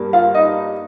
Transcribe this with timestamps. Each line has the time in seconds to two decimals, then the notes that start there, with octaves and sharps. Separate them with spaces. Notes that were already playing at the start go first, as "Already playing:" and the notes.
Already playing: G2 G3 A#3
0.13 F4 F5
0.35 D#4 D#5